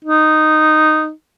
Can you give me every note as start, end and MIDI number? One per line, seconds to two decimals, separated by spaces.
0.04 1.11 63